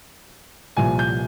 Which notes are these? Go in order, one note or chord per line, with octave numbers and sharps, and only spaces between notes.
C2 A#2 F3 G#5
G6